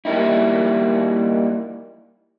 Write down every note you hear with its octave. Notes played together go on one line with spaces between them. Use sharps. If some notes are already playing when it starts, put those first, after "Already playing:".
G3 A#3 D#4 E4